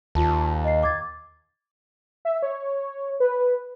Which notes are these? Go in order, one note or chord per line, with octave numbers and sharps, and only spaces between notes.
D#2 F4 A5
D#5 C7
D6 G#6 A6
E5
C#5
B4